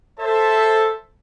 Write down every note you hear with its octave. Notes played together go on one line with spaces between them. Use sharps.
A4 C5 E5 A5